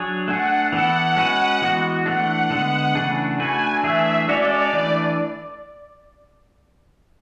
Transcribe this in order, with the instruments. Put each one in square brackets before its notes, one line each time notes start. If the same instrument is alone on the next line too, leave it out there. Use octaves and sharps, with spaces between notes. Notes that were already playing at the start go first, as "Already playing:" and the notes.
Already playing: [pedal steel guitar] F#3 D4 G#4 C#5
[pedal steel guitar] A3 D4 G#4 [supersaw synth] F#5
[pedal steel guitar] E3 B3 E4 A4 [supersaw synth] F#5
[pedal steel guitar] G#3 C#4 F#4 B4
E3 G#3 B3 F#4
[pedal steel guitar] E3 A3 D4 [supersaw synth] F#5
[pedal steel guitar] D3 G#3 B3
C#3 E3 A3 D4 G#4
[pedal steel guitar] A3 D4 F#4 B4 [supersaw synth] G#5
[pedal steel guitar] E3 A3 D4 G#4 [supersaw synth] E5
[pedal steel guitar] G#3 C#4 F#4 A4 C#5 [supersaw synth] D5
[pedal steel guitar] E3 A3 D4